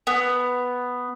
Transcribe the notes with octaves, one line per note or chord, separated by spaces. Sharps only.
B3